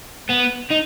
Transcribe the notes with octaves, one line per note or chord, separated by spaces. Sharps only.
B3
D#4